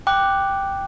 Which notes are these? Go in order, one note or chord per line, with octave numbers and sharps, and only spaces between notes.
G5 D6 F#6